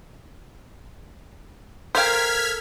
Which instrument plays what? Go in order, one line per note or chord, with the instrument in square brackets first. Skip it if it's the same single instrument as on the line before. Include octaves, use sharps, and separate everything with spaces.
[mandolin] A4 A#4 G5 [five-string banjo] C5 F5 [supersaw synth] F6 G#6 B6